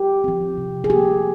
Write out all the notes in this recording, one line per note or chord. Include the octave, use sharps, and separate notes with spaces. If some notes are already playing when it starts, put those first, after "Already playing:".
Already playing: G4
F3 C4
C3
G#4
F3 A#3 G4